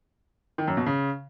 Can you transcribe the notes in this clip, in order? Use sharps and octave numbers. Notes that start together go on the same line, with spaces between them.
D#3
F#2
B2
C#3